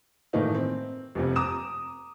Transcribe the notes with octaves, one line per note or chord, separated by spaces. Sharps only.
A2 D#3 E3 A3 A#3 D#4
C4
F1 F2 C3
A#5 D6 D#6 E7